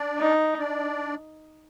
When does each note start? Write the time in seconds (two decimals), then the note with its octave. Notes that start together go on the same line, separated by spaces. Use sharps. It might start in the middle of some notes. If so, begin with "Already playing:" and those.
Already playing: D4 D5
0.19 D#4
0.58 D4 D5